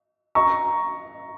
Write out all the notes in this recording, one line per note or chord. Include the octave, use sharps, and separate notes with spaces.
A#5 C#6